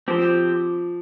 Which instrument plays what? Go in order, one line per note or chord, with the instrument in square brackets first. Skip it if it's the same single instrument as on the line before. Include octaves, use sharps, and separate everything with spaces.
[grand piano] F3 [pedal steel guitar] C4 G4 C5